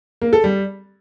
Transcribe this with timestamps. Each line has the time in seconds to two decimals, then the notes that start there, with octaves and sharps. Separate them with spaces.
0.22 A#3
0.33 A4
0.44 G3